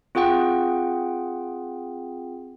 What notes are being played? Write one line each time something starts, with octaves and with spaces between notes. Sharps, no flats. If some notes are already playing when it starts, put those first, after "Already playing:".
C4 F4 G#4 F#5 G5